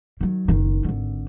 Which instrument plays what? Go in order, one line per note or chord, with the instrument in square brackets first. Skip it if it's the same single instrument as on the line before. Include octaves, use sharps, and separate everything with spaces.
[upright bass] D#3 F#3
F#1 D#3
G#1 D3